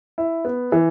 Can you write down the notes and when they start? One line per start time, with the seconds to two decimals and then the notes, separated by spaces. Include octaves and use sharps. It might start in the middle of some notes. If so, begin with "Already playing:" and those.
0.18 E4
0.45 B3
0.72 E3